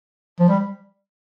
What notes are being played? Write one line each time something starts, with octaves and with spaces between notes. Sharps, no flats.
F3
G3